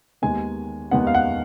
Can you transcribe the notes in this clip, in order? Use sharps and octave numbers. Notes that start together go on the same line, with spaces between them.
D#2 D#3 G#3 B3 G#5
D#2 D#3 G#3 B3 F#5
F5
F#5